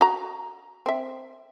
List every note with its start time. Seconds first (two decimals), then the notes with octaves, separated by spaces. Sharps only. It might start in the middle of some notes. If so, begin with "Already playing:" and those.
0.01 F#4 A#5
0.86 C4 E5